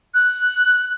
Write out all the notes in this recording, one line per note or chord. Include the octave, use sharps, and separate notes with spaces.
F#6